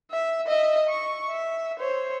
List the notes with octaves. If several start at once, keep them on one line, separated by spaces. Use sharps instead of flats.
E5
D#5 E5
C#6
E5
C5 C#5